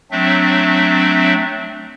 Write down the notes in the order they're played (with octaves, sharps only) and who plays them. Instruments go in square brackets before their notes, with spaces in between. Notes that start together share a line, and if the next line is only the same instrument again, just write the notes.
[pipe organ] F#3 A3 C4 D4 E5